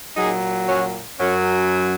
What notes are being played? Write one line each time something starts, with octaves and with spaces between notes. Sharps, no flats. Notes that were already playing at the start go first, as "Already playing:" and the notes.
A#2 F#3 D#4 G#4
C#4 F#4
F#2 F#3 C#4